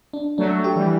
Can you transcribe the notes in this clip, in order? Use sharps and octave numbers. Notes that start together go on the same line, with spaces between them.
D4
F#3 A3 D4
G4
E3 G3